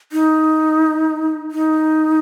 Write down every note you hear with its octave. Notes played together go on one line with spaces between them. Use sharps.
D#4
D#4